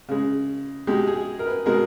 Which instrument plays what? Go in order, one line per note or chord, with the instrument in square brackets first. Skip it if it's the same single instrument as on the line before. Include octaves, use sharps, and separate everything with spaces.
[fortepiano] C#3 G#3
B2 G#3 G4
G#4
A#4
B4
B2 G#3 A#4